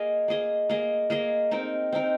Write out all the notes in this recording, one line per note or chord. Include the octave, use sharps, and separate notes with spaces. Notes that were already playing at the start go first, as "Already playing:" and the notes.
Already playing: A#3 G#4 D#5
A#3 G#4 D#5
A#3 G#4 D#5
A#3 G#4 D#5
C4 D#4 A#4
C4 D#4 A#4